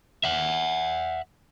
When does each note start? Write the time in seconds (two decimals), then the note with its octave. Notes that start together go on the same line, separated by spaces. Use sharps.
0.24 E5 F#5